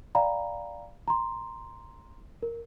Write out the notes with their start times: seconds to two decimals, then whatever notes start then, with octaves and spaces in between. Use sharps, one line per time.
0.15 D5 F5 G5 A#5 B5
1.08 A#5 C6
2.42 A#4